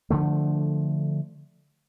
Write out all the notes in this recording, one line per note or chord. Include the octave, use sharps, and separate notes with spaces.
D3 F3 A3